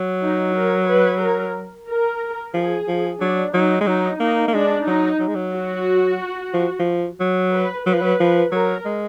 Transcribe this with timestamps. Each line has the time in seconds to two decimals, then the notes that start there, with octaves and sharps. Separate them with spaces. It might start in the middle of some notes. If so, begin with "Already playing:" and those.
Already playing: F#3
0.22 D#4
0.55 A#4
0.88 B4
1.22 A#4
1.88 A#4
2.54 F3 G#4
2.88 F3
3.20 F#3 D4
3.54 F#3 D#4
3.81 G#3
3.87 F#3 D#4
4.20 A#3 D#4
4.48 A#3
4.54 G#3 D4
4.86 F#3 D#4
5.20 F#3
5.28 G#3
5.35 F#3
5.54 F#4
6.54 F3
6.80 F3
7.20 F#3
7.52 B4
7.86 F#3 B4
7.94 F3
8.02 F#3
8.20 F3
8.52 F#3 A#4
8.85 G#3